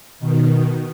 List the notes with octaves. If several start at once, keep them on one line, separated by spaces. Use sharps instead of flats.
B2 D#3